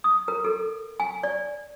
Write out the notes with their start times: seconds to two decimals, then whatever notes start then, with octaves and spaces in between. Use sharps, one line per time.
0.04 D#6
0.28 A#4
0.45 A4
1.00 G#5
1.23 D5